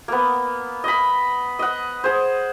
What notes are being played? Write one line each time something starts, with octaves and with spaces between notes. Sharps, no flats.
A#3 B3
D#5 B5
D#5 F#5
G#4 C5